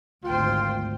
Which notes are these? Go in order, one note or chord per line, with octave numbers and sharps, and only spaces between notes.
G#1 D2 F4 C5 G5